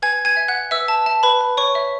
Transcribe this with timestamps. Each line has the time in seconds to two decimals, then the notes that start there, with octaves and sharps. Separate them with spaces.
0.02 B4 G#5 G#6
0.25 G#5 G#6
0.37 E5
0.48 F#5 F#6
0.71 B4 E5 E6
0.88 A5
1.06 E5 A5
1.23 B4 B5
1.41 B4
1.57 C#5 C#6
1.75 E5